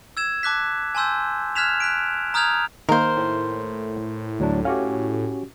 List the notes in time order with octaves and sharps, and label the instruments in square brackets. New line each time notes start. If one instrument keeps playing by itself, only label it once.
[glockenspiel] E6 G#6 E7
A5 D6 F#6 B6
G#5 A5 C6 E6 G6
F6 F#6 G#6 B6 E7 F7
F#6 B6 D7
A#5 D#6 F6 G6 G#6 F7
[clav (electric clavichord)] D#3 A#3 [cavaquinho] A#4 C5
[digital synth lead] A2
[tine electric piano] D2 F#3 D4
[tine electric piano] C#4 F#4 G4 [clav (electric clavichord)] F5